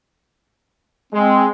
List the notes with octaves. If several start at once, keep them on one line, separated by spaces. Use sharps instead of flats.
G#3 C4